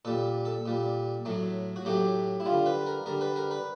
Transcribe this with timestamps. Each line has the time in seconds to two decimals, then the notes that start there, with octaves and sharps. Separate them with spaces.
0.05 A#2 G3 A4
0.45 A4
0.66 A#2 G3
1.25 A2 F#3 A3
1.76 F#4
1.85 A2 F#3 A3 G4
2.40 E4
2.45 D3 G3 F4
2.66 B4
2.86 A#4
3.06 D3 G3 A#4
3.21 B4
3.36 A#4
3.51 B4